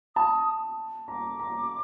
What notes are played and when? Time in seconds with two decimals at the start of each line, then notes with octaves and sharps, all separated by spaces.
0.16 A5 D#6
1.08 A#5 D6
1.39 A#5